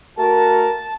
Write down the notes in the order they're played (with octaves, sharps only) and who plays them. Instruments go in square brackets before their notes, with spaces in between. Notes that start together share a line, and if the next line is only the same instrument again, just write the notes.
[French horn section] A3 F#4 A#4 [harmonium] A5